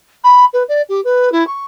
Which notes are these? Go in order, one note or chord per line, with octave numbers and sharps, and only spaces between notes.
B5
B4
D5
G4
B4
E4
C#6